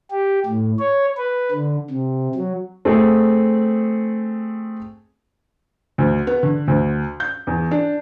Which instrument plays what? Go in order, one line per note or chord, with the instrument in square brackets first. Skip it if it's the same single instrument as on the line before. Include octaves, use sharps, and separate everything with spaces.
[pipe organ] G4
A2
C#5
B4
D3
C3
F#3
[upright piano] A3 C4 G#4
[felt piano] D2
B3
D3
D2
G6
E2
D4